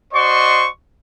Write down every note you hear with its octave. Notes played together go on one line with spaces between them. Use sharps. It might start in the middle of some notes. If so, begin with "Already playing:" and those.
F#4 C5 D5 D#5 C6 C#6